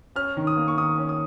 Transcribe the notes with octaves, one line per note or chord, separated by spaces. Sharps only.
C#4 F6
D#3
D#6
A#3
C#6
D#3 D#6
C#4
D#6